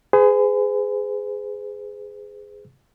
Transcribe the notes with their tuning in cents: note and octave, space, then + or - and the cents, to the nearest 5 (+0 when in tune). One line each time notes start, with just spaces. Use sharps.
G#4 +0 B4 +45